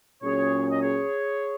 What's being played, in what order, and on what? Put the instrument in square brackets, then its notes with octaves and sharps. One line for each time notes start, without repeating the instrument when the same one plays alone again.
[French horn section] A#2 F#3 C#4 [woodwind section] G#4 C#5
[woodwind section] D#5
G#4 C#5